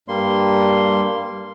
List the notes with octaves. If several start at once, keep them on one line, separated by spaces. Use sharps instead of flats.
G2 G3 A#3 C6